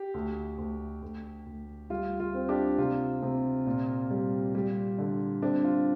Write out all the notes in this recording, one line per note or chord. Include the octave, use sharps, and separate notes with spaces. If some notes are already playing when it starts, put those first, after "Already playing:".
Already playing: G4
D2
D2
D2
D2
G3 F4
F4
C4
D4 G4
C3 F4
C3
A#2
G3
G3
D3
C4 D4
F4